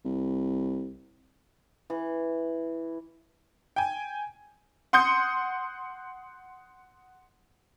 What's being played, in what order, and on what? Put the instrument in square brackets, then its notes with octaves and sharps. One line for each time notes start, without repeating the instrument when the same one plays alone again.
[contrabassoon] C2
[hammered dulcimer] E3
[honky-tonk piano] G5 G#5
F#5 C6 D#6 G6 C#7